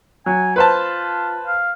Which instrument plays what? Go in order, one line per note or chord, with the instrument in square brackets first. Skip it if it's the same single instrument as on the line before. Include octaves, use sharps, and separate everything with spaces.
[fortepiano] F#3 [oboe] G#5
[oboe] F4 [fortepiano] B4 C5 A5
[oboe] F5